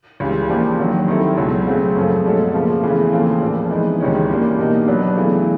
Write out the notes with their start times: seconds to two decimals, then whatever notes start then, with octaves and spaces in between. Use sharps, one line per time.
0.20 C#2 C#3 E3 G3
0.49 F3 A#3 D4 G4
0.79 D#2 D#3 F#3
1.08 D#3 G3 C4 E4 A4
1.37 C#2 B2 F#3
1.67 C#3 F#3 A3 C4
1.96 F#2 C#3 F3 A3
2.25 B2 G#3 C#4 F#4 A4
2.54 C#3 F3 A#3
2.83 E2 C#3 E3 A3
3.12 D#2 C#3 F3 A3 C4
3.42 A#2 F3 A#3 D4
3.71 E3 G#3 B3 D#4
4.00 C#2 C3 D#3 G#3 C#4
4.29 E3 G3 A#3 D4
4.58 B2 G3 A#3 D#4
4.88 F#3 B3 D4
5.17 E2 C#3 E3 A3